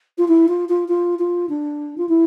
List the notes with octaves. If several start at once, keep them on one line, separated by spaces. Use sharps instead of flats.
F4
E4
F4
F4
F4
F4
D4
F4
E4